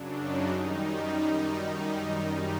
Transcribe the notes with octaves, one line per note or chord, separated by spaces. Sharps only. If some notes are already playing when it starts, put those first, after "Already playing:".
Already playing: F#2 C#3 F#3 D4
D#4
F#2 D#3 G3
D#4